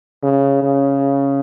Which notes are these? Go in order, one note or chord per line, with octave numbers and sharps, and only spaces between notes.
C#3
C#3